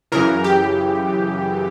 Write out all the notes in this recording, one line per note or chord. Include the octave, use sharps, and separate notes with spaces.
F#2 C#3 E3 A#4
G4